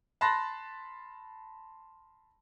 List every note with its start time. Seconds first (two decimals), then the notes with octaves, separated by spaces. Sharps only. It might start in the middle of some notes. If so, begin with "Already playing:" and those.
0.21 A5 B5 C6 F#6 A6 A#6